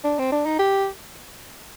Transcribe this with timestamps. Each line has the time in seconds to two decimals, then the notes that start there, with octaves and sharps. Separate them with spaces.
0.04 D4
0.19 C4
0.32 D4
0.46 D#4
0.59 G4